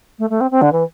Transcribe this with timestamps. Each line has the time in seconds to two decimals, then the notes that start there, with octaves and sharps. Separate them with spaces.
0.19 A3
0.30 A3
0.40 C4
0.51 C4
0.62 D3
0.72 E3